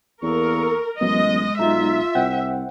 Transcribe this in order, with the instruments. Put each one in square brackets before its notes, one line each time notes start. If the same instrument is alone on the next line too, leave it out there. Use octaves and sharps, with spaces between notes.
[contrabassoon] E2 [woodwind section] A#3 A4 C#6 [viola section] A#4
[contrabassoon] A1 [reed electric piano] F#3 B3 [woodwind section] G#3 [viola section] D#5
[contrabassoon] B1 [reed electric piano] G#3 D#4 A#5 [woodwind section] F4 [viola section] E5
[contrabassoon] C2 [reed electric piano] C5 F#5 G5